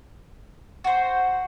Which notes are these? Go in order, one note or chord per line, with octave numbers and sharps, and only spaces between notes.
F#4 C5